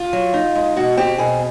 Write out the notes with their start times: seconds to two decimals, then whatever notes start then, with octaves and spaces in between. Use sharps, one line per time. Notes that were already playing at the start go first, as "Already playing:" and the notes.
Already playing: F4
0.13 F#3
0.34 D#4
0.55 G#3
0.76 B2 F#4
0.97 C4 G4
1.18 B2 G#4